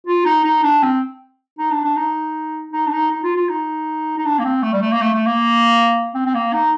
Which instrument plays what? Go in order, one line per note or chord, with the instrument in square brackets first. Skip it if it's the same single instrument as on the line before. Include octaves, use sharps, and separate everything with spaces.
[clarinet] F4
D#4
D#4
D4
C4
D#4
D4
D4
D#4
D#4
D4
D#4
D#4
F4
F4
D#4
D#4
D4
A#3
C4
A3
G3
A3
A#3
A3
A3
A#3
C4
C4
A#3
D#4